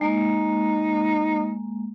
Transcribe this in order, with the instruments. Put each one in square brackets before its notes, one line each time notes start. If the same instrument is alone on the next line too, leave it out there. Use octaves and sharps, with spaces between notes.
[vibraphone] G#3 A#3 [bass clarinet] D#4